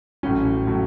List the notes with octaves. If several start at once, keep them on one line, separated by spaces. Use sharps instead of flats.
A1 A2 F#3 C#4
A2 F#3